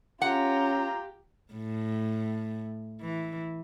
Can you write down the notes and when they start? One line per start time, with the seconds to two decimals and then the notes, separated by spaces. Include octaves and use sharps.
0.22 C#4 F4 G4 F#5 A#5
1.54 A2
3.01 E3